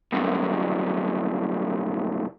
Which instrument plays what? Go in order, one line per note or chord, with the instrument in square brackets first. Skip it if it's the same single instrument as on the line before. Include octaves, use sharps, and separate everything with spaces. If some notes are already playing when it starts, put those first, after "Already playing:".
[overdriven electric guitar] C2 F#2